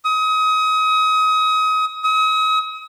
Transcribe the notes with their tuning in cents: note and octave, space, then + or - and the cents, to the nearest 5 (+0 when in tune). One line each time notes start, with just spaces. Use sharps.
D#6 +30
D#6 +40